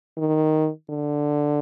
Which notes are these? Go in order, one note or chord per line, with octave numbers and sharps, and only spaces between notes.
D#3
D3